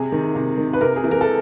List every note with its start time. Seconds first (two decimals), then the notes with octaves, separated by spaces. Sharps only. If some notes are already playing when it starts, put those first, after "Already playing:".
Already playing: C3 G#4
0.12 D#3
0.35 C3
0.58 D#3
0.73 B4
0.81 C3 A#4
0.96 G#4
1.04 E3
1.11 A#4
1.21 A4